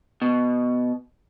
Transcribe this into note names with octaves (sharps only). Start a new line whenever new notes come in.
B2